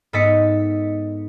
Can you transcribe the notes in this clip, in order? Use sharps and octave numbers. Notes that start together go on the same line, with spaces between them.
G#2 B3 A4 D#5 B6 C#7